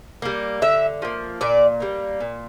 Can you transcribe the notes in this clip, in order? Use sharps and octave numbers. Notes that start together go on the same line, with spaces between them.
G3 A#3
D3 E5
F3 A#3
A#2 D5
G3 A#3
A#2